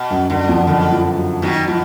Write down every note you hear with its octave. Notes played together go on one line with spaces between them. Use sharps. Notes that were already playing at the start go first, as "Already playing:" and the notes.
Already playing: B2
F#2
F#2 D3
F2
B2 D3
F3
F#3
B2 D#3 F#3
B2 F3